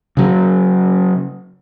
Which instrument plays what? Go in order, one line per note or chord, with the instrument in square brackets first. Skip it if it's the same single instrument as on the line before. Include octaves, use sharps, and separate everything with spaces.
[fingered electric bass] C#3 F#3